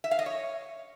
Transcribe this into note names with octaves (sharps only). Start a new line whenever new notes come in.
E5
F5
D#5
C#5